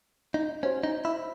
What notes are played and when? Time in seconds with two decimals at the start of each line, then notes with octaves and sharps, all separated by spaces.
0.34 D#4
0.63 C#4 F#4 C5 F#5
0.84 D#4
1.05 E4